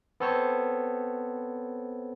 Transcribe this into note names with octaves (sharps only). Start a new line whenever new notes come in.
B3 C4 A4 C5 C#5